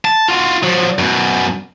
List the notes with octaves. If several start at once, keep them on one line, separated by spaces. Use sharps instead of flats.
A5
F4 F#4
F3 F#3
F#2 B2